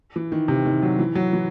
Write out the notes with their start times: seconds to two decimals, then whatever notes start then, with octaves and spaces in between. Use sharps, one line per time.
0.16 E3
0.32 D#3
0.48 C3
0.65 D#3
0.82 F#3
0.99 E3
1.15 F#3
1.33 E3